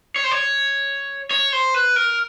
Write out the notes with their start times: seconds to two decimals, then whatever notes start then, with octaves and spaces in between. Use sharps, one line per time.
0.16 C#5
0.24 C5
0.31 C#5
1.31 C#5
1.53 C5
1.74 B4
1.96 A#4